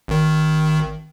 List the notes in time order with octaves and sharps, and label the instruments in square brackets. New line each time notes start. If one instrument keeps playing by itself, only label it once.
[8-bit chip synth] G#1 D#3